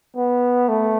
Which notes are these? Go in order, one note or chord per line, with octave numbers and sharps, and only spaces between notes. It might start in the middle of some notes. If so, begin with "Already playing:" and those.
B3
A3